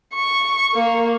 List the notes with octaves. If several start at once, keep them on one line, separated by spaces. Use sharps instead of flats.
C#6
A#3